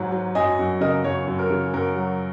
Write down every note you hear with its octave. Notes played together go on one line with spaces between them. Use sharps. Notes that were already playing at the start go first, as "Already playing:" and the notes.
Already playing: G#2 F#3
F#3
F#2 D#5 G#5
F#2
C#3 A#4 D#5
F#2 C#5
F#2
A#4
C#3
F#2 A#4
F#3